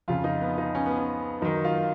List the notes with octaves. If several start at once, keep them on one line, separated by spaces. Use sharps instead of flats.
F2 C#3 F4
D#4
B3
D#4
C#4
B3
C#4
F#2 D#3 D#4
F4